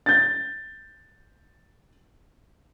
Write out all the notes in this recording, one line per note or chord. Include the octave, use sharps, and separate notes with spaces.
G6 A6